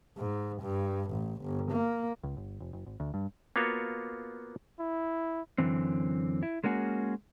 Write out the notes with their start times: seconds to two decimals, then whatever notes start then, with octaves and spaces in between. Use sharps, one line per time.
0.18 G#2
0.62 G2
1.11 A1
1.42 G1
1.71 A#3
2.23 C#2
2.37 G1
2.60 F1
2.73 F#1
2.86 G#1
3.00 D2
3.14 G2
3.56 A#3 B3 F4 F#4 C#5
4.80 E4
5.58 F#2 A2 D3 E3 C4
6.43 E4
6.64 G#3 A#3 C#4 F#4 G#4